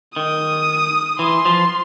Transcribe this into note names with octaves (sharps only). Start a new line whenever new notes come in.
D#3 D#6
E3 C6
F3